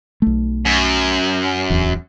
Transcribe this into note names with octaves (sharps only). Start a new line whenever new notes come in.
B1 A3
F#2
D1 E2